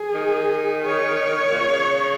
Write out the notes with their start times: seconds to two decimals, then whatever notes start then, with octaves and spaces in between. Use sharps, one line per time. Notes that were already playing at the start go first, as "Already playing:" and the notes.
Already playing: G#4
0.14 D#3
0.86 C#5
1.52 A#2
1.60 C#3